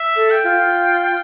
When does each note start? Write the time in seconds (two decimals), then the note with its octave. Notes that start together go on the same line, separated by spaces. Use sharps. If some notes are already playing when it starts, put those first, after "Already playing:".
Already playing: E5
0.16 A4
0.30 G5
0.44 F4